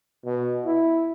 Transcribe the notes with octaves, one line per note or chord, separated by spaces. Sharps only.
B2
E4